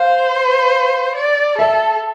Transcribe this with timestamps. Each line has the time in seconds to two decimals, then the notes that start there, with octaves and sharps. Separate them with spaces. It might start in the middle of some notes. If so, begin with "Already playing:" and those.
Already playing: C5 F5
1.15 D5
1.58 A4 E5